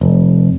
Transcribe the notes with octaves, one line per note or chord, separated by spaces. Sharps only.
F1